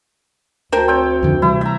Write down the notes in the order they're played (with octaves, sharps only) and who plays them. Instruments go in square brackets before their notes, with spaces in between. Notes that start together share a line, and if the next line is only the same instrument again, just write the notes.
[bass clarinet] D2 [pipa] A#4 C5 [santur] G5 A5
[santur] C4 C#5 G5
[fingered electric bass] F2 D3 D#3
[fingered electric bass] C3 E3 G3 [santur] E4
[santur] E5 A#5